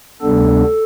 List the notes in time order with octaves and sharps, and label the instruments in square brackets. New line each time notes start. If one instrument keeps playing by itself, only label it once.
[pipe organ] D2 C3 G3 B3 D4 A4